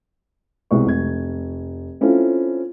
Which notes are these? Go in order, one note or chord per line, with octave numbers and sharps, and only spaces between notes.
C2 B2 G#3 C#6
F1 G#6
C4 C#4 E4 F4 A4